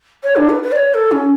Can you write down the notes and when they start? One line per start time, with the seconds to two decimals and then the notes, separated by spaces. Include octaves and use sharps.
0.23 C#5
0.36 D4
0.49 B4
0.63 B4
0.72 D5
0.76 C#5
0.94 A4
1.11 C#4